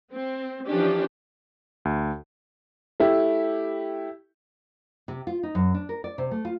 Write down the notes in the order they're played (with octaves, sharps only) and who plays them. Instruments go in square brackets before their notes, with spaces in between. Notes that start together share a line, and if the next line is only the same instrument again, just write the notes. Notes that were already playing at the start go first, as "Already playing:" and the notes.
[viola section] C4
E3 F3 C#4 D4 G4
[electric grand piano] D2
[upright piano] A3 E4 G4
[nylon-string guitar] C3
F4
D#4
F#2
D4
A#4
D5
C3
A3
F4